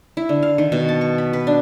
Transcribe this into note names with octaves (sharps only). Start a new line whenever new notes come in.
E4
D3
F5
D#3
B2
A5
C#6
B5
B4
D4